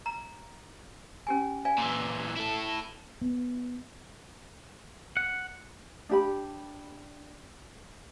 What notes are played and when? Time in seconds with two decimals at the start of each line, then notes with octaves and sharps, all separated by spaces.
0.06 A#5
1.27 C#4 G4 G#5
1.65 D5 F5 G#5
1.78 A#2 E3
2.37 E4 A4
3.21 B3
5.17 F#5
6.09 D4 G4 B5